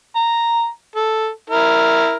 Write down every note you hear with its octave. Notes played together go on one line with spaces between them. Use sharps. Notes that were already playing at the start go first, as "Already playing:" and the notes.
A#5
A4
E4 A#4